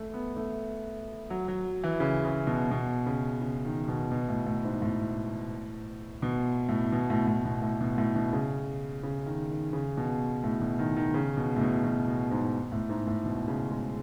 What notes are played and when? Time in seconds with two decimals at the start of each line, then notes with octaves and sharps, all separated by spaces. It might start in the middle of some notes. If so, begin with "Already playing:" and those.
Already playing: A3
0.14 B3
0.37 A3
1.30 F#3
1.48 F#3
1.84 E3
2.00 C#3
2.24 C#3
2.47 B2
2.71 B2
3.06 C#3
3.41 C#3
3.65 D#3
3.88 B2
4.11 B2
4.29 A2
4.47 A2
4.65 G#2
4.82 A2
6.22 B2
6.69 A2
6.92 B2
7.10 A2
7.28 A2
7.45 B2
7.62 A2
7.80 B2
7.98 A2
8.15 B2
8.33 C#3
9.03 C#3
9.26 D#3
9.50 D#3
9.73 C#3
9.97 B2
10.44 A2
10.61 B2
10.79 D#3
10.96 D#3
11.14 C#3
11.37 B2
11.56 A2
11.61 B2
11.84 B2
12.07 B2
12.31 G#2
12.72 A2
12.89 G#2
13.07 A2
13.25 B2
13.48 C#3
13.71 G#3